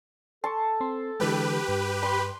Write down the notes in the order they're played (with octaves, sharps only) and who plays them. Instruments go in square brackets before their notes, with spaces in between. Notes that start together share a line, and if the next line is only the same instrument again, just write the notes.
[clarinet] A4 [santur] A5 [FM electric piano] C6 C#6
[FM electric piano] C4 C6
[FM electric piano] D3 E3 G#3 [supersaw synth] G4 B4
[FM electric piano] G2
[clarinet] B5 [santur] C6